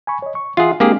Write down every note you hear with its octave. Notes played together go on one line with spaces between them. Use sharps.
G#5 B5 C#6
C#5 D#5
C#6
E3 F4 G#4 E5 F#5
G#3 A#3 C4 D4 G4 G#4